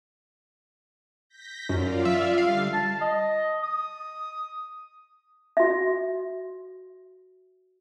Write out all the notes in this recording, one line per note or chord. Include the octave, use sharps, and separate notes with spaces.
G6 A#6 B6
F#2 F4 D5 F5
E5
D3 G3 F5
A5
D#5
D#6
F#4 E5